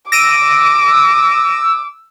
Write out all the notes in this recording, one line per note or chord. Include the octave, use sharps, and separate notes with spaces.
D6 E6 A#6 D7 D#7